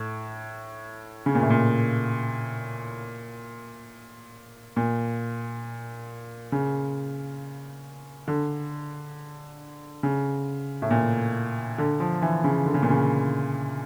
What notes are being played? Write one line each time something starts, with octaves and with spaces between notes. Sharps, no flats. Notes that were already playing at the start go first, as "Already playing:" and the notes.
Already playing: A2
C#3
A#2
A2
A#2
A#2
C#3
D3
C#3
A2
A#2
D3
F3
E3
C#3
D3
C#3
A#2
C#3